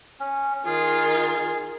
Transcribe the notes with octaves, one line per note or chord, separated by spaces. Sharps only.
C#4
D#3 F4 G#4